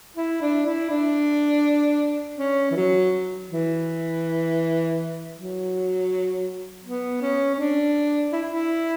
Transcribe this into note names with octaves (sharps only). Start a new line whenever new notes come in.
E4
D4
E4
D4
C#4
E3
F#3
E3
F#3
B3
C#4
C#4
D4
E4
E4